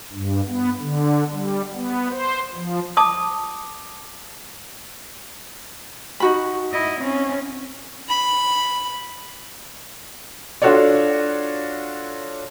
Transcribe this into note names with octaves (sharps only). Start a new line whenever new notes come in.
G2
B3
D3
G3
B3
C5
F3
A5 D6 D#6
D#4 F#4 B5
E4 D#5
C4 C#4
B5
D4 F4 F#4 A4 C#5 D5